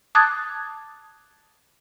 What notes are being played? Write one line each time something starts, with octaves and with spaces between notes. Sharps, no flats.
A5 D6 D#6 F#6 G#6 A6